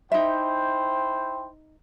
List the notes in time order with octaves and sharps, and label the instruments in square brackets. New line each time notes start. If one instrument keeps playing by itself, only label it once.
[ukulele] D#4 E5 [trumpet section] E4 C5 G5